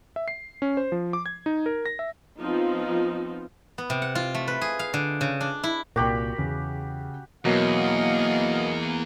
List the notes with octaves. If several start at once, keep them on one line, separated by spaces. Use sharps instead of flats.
E5
C7
C#4
C5
F3
D6
G#6
D#4
A#4
A#6
E5
F3 B3 C4 D#4 F4
B3
C3
F#5
F4
A3
B4
G#4
F5
D3
C#3
D4
E4
C2 A#2 F#4 G4 A#4 G5 B5
E2 C#3
E2 B2 F#3 A#3 D#5 F5